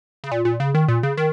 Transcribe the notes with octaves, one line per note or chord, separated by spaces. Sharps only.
C#3
A#2
A#2
C#3
D#3
A#2
C#3
D#3